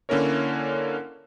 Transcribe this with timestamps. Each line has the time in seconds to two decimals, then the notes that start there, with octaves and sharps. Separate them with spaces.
0.09 D3 A#3 C#4 E4 A#4 C#5